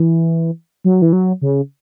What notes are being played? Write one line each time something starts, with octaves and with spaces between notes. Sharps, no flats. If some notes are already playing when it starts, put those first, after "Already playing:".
Already playing: E3
F#3
E3
F#3
C#3